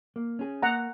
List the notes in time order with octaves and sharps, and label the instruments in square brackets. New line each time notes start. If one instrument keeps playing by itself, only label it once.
[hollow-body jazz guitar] A#3
C#4 G#4
[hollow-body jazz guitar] A#3 [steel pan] F#5 A#5